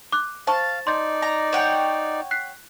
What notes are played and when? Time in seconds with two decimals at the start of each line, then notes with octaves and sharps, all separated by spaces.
0.12 D6 F#6
0.47 C5 F5 A5 C#6
0.87 D#4 D5 C6 G6 A6
1.22 A#5
1.53 C#5 F#5 G5
2.31 F#6 B6 C7